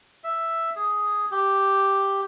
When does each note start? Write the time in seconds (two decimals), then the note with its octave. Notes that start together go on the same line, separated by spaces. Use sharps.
0.24 E5
0.76 G#4
1.31 G4